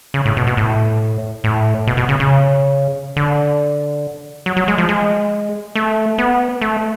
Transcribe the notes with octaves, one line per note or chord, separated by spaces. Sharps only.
C#3
A2
B2
B2
A2
A2
B2
B2
C#3
C#3
D3
F#3
F#3
G#3
F3
G#3
A3
B3
A3